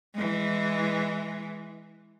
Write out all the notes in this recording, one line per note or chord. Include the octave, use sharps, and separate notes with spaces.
E3 G#3